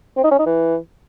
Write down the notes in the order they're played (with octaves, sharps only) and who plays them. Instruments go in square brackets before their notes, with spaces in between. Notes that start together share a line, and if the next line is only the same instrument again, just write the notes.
[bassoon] C4
D#4
C#4
D#4
E3